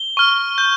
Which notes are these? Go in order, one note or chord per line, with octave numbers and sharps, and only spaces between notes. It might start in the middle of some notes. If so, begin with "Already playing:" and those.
Already playing: G7
C#6 F6
G6